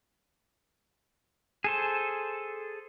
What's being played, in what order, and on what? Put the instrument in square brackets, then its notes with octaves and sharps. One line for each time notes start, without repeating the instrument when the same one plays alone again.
[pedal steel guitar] G#4 A4 C5